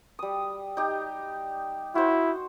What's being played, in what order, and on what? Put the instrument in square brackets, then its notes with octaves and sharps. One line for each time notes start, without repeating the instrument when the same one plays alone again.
[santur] G3 D#6
D#4 G4
[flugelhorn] E4 [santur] F#4 C5